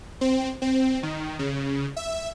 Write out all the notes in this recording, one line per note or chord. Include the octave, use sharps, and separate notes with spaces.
C4
C4
D#3
C#3
E5